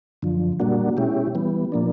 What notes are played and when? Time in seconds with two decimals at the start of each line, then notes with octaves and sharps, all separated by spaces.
0.22 F#2 D3 F3
0.60 A#2 G3 A#3 D4 F#4
0.97 B2 G#3 C#4 E4 G4
1.35 E3 G3 B3
1.72 A#2 F3 A#3 D4